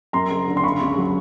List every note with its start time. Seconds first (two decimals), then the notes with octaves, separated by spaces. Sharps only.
0.13 F#2 A#5 C6
0.30 F#1
0.48 D3
0.57 C6
0.63 C#3 B5 C#6
0.81 C#2
0.97 F#3